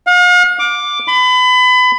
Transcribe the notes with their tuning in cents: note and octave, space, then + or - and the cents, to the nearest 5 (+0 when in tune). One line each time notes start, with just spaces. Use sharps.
F5 +45
D6 +0
B5 +30